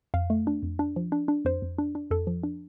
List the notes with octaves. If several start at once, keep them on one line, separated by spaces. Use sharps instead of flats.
F2 F5
A3
D4
F2
D4
F3
D4
D4
F2 C5
F2
D4
D4
F2 A4
F3
D4